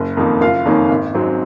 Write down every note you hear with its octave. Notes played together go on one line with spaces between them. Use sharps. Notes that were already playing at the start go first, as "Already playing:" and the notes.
Already playing: F#1
F2 D#3 A#3 D#4
F#1 F4 F5
F2 D#3 A#3 C#4
G#1
G#2 F#3 C4